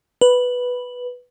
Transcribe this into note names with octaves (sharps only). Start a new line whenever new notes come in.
B4